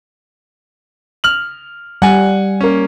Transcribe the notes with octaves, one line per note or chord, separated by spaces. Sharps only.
F6 F#7
G3 F#5 G#5
A#3 C#4